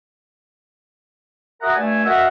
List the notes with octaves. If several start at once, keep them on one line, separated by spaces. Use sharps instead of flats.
F#4 A#4 E5 F#5 A#5 D#6
G2 A3 D5 G#5
F#4 A#4 D#5 E5